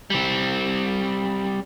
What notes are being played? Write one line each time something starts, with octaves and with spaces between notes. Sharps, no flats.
G3 C4